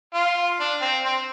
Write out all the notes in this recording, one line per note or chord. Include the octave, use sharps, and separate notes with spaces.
F4
D4
C4
C4